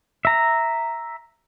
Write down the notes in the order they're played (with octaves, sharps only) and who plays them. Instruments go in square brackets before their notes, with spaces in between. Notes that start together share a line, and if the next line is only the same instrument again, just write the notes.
[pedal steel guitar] E5 A#5